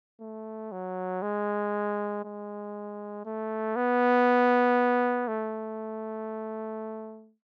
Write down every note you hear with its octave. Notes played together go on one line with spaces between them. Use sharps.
A3
F#3
G#3
G#3
A3
B3
A3